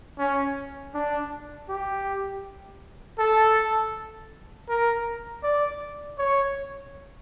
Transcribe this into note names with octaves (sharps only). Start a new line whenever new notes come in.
C#4
D4
G4
A4
A#4
D5
C#5